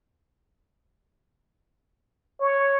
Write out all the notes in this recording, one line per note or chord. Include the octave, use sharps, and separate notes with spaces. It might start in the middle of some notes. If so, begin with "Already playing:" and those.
C#5